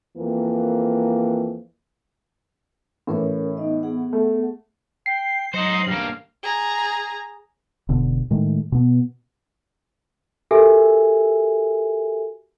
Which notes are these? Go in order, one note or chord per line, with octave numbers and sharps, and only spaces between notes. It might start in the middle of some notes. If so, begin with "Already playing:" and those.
F2 E3 A#3
A2 E3 C#4 A#4 C#5
B3 D#4 D#5
B3 G#4 F#5
A3
G5 C7
F#3 D#4 C5 D#5
G2 A#3 F6
G#4 A#5
E1 B2 D3
A2 D#3 G#3 A3
B2 B3
F#4 G4 A4 A#4 E5 G#5